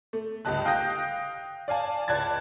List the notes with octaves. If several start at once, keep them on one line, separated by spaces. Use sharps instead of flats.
A3
C#2 G3 G4 D#5 A5 F#6
F5 G5 D#6 G6 A#6
D5 F5 G#5 A5
C#2 D5 A5 F#6 G#6 A6